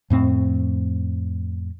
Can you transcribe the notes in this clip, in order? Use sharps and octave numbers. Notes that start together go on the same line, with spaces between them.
F2 A2 C4